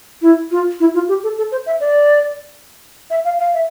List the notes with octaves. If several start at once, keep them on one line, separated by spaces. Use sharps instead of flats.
E4
F4
E4
F4
G4
A4
A4
C5
E5
D5
E5
F5
F5
E5